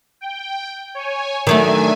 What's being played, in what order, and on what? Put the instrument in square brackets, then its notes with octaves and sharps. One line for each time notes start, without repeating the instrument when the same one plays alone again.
[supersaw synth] G5
C#5 G#5
[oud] D#3 F#3 A3 [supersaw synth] D4 E5 G#5